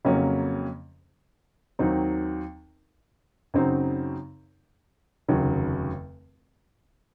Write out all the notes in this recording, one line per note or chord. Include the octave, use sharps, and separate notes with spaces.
F2 C#3 F#3 A#3 C#4
D#2 D#3 F#3 C4 D#4
F#2 C#3 F#3 C4 D#4
F1 D#2 C#3 F#3